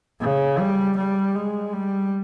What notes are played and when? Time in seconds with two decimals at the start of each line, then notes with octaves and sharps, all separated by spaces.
0.20 C#3
0.59 G3
0.97 G3
1.35 G#3
1.73 G3